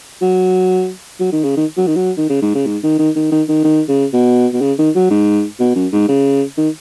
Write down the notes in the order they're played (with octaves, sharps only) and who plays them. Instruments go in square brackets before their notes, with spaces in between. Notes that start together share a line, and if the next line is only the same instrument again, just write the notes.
[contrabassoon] F#3
F#3
D#3
C#3
D#3
F#3
D#3
F#3
D#3
C#3
G#2
C#3
G#2
D#3
D#3
D#3
D#3
D#3
D#3
C#3
B2
B2
C#3
D#3
F#3
G#2
B2
F#2
G#2
C#3
D#3